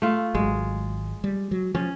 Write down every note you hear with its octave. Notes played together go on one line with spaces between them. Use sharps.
A3 F4
G#1 F#3 G#3
G3
F#3
F3 C#4